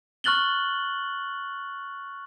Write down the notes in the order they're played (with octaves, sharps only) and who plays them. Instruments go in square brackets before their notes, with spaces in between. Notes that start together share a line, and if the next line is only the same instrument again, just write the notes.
[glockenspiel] C#6 F6 F#6 A6 F#7 G7